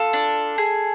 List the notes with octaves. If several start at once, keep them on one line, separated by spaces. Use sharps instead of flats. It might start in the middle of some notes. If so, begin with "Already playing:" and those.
Already playing: F4 A4
D4
G#4